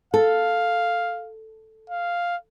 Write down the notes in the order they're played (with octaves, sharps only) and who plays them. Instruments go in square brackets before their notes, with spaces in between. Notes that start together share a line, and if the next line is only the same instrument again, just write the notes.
[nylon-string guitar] A4 [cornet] F5
[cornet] F5